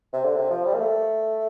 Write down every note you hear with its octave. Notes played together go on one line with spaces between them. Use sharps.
C3
D3
C3
F3
G3
A#3
A3